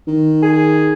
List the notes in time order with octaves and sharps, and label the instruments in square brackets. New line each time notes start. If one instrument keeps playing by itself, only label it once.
[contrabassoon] D#3
[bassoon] G#4